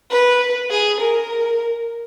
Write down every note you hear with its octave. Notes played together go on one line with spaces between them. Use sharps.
B4
G#4
A#4